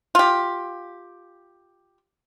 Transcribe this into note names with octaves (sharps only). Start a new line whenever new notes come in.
F4 G4